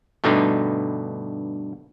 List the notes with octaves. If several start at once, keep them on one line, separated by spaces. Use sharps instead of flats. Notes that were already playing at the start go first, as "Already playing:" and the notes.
G2 B2 D3 A3 D#4